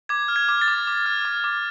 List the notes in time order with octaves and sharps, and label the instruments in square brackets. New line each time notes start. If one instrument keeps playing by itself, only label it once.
[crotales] D6 G#6
F6
G#6
D6
A6
D6
D6
F6
D6
D6